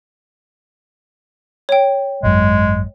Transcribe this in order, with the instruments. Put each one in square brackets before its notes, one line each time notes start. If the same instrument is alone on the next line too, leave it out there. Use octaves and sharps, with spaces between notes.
[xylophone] C#5 G5
[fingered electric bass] G#1 F#2 [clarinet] G#3